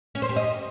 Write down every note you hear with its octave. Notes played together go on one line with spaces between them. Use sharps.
C#4
C5
G4
D#5